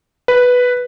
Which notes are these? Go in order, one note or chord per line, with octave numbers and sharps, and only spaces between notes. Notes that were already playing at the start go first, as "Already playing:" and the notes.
B4